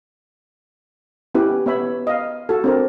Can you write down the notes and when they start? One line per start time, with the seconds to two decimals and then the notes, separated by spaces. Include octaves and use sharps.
1.35 B3 C#4 E4 G4 B4
1.66 B3 C#5 E5 B5
2.07 D#5 F5
2.49 F#4 A4
2.64 C4 D4 A#4